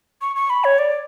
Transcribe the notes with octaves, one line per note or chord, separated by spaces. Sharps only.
C#6
C#6
B5
C#5
D5